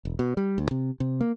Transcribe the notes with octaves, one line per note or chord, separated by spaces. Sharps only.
E1
B2
G3
D2
C3
C3
A#3